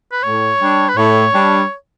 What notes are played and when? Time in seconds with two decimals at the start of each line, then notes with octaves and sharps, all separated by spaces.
0.12 B4
0.23 A2 C#5
0.59 G3 D4
0.89 B4
0.96 A2 C#5
1.33 G3 D4